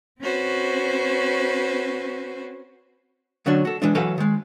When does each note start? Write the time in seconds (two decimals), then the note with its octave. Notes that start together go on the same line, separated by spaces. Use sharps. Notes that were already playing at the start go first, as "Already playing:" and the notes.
0.20 C4 C#4 F#4 B4 C5
3.46 D3 F#3 A3 C#4 D4
3.65 F#4 A4
3.82 E3 G#3 D4
3.95 E3 F#3 A4 B4 F5 F#5
4.18 D#3 G#3